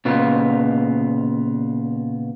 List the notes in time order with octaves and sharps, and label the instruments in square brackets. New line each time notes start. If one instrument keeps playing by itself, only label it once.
[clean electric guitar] A#2 C#3 B3 F4